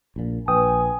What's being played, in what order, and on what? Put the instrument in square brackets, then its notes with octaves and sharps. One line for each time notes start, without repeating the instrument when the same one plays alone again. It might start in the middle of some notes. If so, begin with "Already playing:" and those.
[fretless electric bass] A#1 A#2
[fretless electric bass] A#1 [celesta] B4 [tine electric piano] G5 D#6 [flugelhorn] G#5